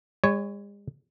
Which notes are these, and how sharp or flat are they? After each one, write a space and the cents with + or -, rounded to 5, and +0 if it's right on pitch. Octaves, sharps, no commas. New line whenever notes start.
G#3 -45 C#5 +0